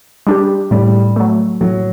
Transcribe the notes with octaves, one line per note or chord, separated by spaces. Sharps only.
G3 D4 G4
A2 G3
F#3 A3
A2 F#3